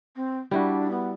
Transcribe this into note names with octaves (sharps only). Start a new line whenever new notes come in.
C4
G3 D4 E4 F#4
B3